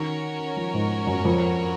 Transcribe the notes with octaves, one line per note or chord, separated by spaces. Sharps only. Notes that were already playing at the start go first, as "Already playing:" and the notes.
Already playing: D#3 C#4 F#4 A#4 C#5
F3
G#2
F#2
F2